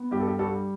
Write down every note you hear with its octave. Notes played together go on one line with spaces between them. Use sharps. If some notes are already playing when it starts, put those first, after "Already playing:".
Already playing: B3
G2 G4
A4
G4
G3 F#4 A4